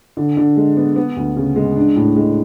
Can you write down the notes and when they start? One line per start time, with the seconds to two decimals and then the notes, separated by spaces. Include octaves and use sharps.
0.17 D3
0.37 D3
0.57 G#3
0.77 B3
0.96 B3
1.16 D2
1.37 C#3
1.56 G#3
1.76 D4
1.96 A2
2.16 G#3